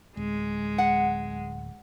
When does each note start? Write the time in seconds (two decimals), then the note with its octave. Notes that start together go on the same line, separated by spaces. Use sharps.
0.17 D1 G#3
0.78 F#5